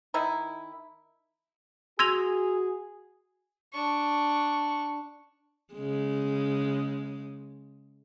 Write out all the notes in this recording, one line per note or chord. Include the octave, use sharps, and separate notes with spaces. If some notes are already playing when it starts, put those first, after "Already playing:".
D#3 D#4 E4
F#4 G#4 C6 E6 G#6 A#6 D#7 F7
D4 C#6
C#3 G#3